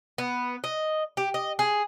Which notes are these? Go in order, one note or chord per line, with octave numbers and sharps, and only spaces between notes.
B3
D#5
G4
D#5
G#4